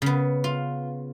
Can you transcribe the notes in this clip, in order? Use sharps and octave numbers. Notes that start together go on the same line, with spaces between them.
C#3 B3
F4